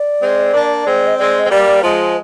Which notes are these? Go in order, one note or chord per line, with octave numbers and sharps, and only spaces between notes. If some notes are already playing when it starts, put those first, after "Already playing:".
Already playing: D5
G#3 C4
A#3 D4
G#3 C4
D#5
G#3 C4 D5
D#5
C4
G3 A#3 D5
F3 G#3 C5